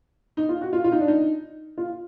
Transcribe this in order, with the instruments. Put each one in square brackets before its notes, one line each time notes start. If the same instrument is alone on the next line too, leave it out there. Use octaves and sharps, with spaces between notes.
[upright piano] D#4
F4
F#4
F4
F4
D#4
D4
D#4
F4